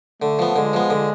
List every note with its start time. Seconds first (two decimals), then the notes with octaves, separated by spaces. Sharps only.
0.22 D3 A3
0.39 F3 B3
0.56 D3 G#3
0.73 F3 B3
0.90 D3